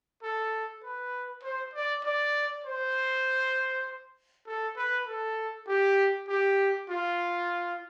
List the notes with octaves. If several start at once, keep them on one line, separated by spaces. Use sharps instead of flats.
A4
B4
C5
D5
D5
C5
A4
B4
A4
G4
G4
F4